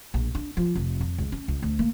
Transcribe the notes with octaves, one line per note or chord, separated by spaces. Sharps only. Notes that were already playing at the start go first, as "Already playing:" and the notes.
A#1
D4
F3
F1
F2
C#2
C#4
C#2
D2
A#3